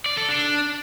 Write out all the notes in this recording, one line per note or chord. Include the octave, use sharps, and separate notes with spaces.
D5
A4
D4